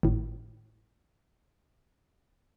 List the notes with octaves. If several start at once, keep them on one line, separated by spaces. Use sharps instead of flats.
G#1 A2